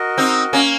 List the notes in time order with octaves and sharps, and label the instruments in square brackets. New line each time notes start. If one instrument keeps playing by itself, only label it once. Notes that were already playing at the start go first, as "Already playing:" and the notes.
Already playing: [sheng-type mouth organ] F#4 A#4 D#5
[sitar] C4 D#4
A#3 C#4